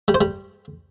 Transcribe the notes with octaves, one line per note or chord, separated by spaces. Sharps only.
G3
C5
G3